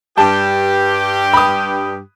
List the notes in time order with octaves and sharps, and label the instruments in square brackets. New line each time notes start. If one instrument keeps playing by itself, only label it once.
[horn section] G2 G4 [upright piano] A5
[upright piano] B5 D#6